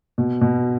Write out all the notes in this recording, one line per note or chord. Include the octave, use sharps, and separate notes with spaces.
B2
B2